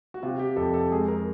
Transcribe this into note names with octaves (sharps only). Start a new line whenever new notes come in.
F#4
C3 F4
G4
F2 A4
A4
G#3 G#4
A#4